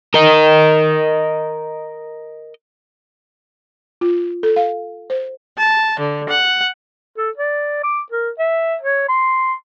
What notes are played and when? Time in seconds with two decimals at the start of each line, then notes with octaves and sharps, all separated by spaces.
0.14 A#4 D#5
4.01 F4
4.43 A4
4.56 F5
5.10 C5
5.57 A5
5.99 D3
6.29 F#5
7.18 A4
7.37 D5
7.84 D6
8.11 A#4
8.39 E5
8.81 C#5
9.09 C6